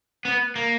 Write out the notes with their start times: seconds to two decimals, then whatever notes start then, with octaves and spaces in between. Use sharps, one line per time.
0.25 B3
0.56 A#3